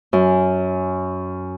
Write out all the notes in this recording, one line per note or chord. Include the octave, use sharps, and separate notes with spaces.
F#2